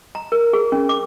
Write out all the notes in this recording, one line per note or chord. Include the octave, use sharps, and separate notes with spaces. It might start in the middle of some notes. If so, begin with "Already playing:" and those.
A#5
A#4
G#4
C#4
D6